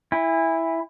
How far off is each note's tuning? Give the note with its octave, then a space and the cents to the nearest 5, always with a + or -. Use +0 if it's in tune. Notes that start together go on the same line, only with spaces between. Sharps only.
E4 +0 G#5 -30